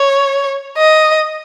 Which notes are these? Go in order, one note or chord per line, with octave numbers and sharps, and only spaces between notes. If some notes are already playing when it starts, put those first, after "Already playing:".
Already playing: C#5
D#5